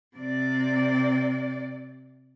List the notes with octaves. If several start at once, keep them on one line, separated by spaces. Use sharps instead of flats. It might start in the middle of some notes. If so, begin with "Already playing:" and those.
C3 D5